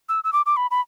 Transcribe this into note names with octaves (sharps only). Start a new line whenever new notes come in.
E6
E6
D6
D6
B5
B5